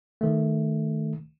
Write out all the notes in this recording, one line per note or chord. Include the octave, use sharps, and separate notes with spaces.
D#3 A3